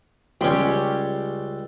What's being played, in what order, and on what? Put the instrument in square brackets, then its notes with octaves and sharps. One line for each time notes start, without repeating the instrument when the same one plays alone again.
[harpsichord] C#2 G3 C6 [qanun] C#4 G4